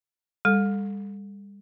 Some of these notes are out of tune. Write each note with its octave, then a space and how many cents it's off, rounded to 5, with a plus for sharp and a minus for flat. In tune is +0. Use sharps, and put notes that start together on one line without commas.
G3 +35 A4 +0